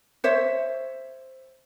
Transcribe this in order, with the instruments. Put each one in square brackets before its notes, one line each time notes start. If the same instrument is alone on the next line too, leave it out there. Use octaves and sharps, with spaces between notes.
[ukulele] C5 C#5 E5